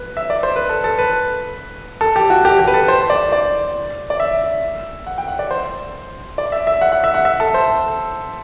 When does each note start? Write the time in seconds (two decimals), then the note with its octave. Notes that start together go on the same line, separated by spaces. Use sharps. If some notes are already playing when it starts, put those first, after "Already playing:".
Already playing: B4
0.17 E5
0.30 D5
0.43 C5
0.56 B4
0.69 A4
0.84 A4
0.98 B4
2.01 A4
2.16 G4
2.30 F#4
2.45 G4
2.59 G4
2.67 B4
2.74 A4
2.88 C5
3.10 D5
3.32 D5
4.10 D5
4.20 E5
5.07 F#5
5.18 G5
5.28 F#5
5.39 D5
5.51 C5
6.38 D5
6.52 E5
6.67 E5
6.81 F#5
6.92 F#5
7.04 E5
7.14 F#5
7.25 E5
7.40 A4
7.54 C5